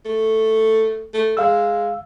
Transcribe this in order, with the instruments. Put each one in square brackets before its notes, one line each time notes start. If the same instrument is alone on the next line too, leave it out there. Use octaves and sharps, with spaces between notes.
[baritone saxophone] A3
A3
[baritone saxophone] G#3 [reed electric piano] F5 E6